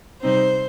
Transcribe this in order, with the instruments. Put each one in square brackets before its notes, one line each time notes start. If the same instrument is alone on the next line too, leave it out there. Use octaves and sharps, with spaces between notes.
[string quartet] C3 G3 C4 D#4 C5